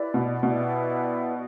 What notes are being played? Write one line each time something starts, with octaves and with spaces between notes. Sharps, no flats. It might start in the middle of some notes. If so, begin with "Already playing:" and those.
Already playing: E4 G4 B4 D5
B2
B2 E4 G4 B4 D5
F#4